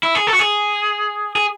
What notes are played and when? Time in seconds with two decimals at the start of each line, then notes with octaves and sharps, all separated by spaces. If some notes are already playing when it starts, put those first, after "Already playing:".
0.03 E4
0.15 G#4
0.27 A4
0.33 F#4
0.39 G#4
1.36 G#4